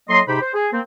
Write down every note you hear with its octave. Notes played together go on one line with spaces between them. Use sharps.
A2 F#3 A#3 D#5 C6
G#2 C3 D#4 G4 C5 B5
C5
G#4
A#3 C4